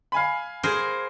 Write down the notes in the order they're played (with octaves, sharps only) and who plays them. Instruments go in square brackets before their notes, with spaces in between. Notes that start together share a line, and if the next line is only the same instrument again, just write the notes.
[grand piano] F5 G#5 B5
[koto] G#4 A#4 C5